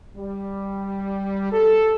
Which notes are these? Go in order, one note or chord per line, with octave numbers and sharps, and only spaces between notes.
G3
A4